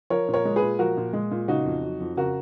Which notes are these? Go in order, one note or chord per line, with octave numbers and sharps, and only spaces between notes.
F3 A#4 C#5
A#2
A#4 C#5
G#3
G#4 B4
A#2
F3 F#4 A#4
A#2
G#3
A#2
C#3 D#4 F#4
F2
F#3
F2
C#3 F#4 A#4